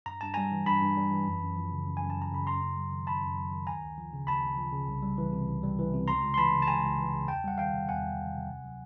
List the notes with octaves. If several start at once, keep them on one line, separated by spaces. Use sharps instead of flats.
G2 A#5
G2 A5
G3 G#5 A#5
E3
G2 A5 B5
G2
G3
E3
F#2
F#2
F3
C#3
F#2
F#2 G#5
A5
F3 A#5
C#3 B5
F#2 A#5 C6
F#2
F#3
D#3
F#2 A5 B5
F#2
F#3
D#3
D2 G#5 A#5
D2
F3
C#3
D2 A5 B5
D2
F3
C#3
C2
G3
E3
C3
C2
G3
E3
C3
C#2 A#5 C6
C#2
C6
E3 A5 B5
C#3
A5
C#2 G#5 A#5
C#2
E3
C#3
E2 G5 A5
G3 F#5
D#3 F5 G5
C3
E2 F#5 G#5
G3
D#3
C3
D2
F#3